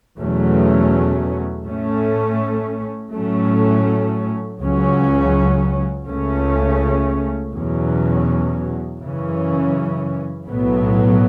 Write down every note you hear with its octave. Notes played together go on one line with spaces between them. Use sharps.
E2 B2 F#3 A3 C#4
A2 A3 C#4
A2 F#3 A3 C#4
C#2 C#3 F#3 C#4
C#2 C#3 A3 C#4
E2 B2 F#3 C#4
F#2 C#3 E3 C#4
B1 A2 F#3 B3